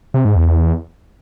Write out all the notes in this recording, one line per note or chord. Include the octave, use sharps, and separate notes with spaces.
C3
G#2
E2
E2